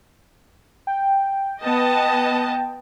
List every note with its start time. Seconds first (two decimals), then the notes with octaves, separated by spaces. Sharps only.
0.87 G5
1.63 B3 D#5 A5